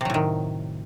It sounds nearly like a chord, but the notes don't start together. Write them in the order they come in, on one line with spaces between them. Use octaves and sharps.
C3 F#3 A2 D#3